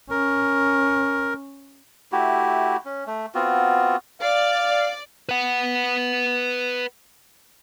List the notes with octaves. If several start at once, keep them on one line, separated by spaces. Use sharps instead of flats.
C#4 A#4
A3 E4 F#4 G4
C#4
A3
B3 C4 F4 F#4
D5 F5
B4 F#5